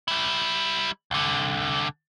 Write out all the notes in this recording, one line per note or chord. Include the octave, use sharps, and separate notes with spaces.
G3 E4
C2 D3